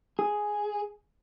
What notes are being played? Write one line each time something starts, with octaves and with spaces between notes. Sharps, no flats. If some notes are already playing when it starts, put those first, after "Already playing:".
G#4